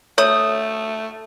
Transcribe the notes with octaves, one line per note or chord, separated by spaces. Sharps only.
A3 C#5 D#6